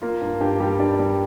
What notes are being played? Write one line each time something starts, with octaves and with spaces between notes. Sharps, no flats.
A#3 F4
G2
G2 G4
G3 G4
G2 D5
G3